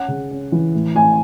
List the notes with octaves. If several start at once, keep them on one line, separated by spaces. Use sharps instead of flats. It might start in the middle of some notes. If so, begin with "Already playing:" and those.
Already playing: C#4 F#5
C#3
C#4
E3
A2
A2 G#5